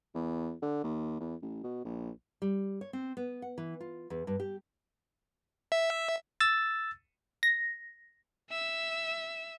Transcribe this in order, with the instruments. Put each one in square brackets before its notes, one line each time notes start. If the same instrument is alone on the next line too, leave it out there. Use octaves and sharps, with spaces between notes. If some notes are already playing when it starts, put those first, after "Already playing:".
[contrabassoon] E2
D3
D#2
E2
A1
B2
A#1
[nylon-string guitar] G3
C#5
C4
B3
F#5
E3
F4
E2
G2
G4
[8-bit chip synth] E5
[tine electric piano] E6 A6
[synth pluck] A#6
[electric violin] E5 E6